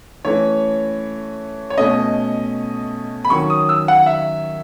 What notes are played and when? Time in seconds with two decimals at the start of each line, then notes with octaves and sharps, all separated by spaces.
0.25 E3 A3 C#4 C#5
1.70 C#5
1.78 B2 A3 C#4 D#5
3.25 B5
3.30 D#3 F#3 C#4 C#6
3.50 D#6
3.69 E6
3.88 F#5
4.06 E5